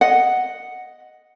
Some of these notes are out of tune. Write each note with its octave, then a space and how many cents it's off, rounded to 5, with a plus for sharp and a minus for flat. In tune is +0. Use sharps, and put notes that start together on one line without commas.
D#5 +0 F#5 +0